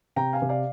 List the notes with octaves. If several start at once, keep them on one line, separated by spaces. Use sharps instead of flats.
C3 G5 A#5
F5 G#5
C3
D5 F5